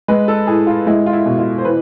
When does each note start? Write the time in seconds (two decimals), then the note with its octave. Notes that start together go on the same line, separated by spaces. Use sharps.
0.08 G#3 B4
0.28 A4
0.47 A2 G#4
0.67 F4
0.87 G#3 E4
1.06 F4
1.13 E4
1.26 B2
1.39 F4
1.58 C5
1.65 E3 B4